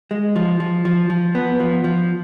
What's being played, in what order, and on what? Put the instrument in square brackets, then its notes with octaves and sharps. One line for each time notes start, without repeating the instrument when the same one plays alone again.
[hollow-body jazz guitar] G#3
F3
F3
F3
F3
B3
F3
F3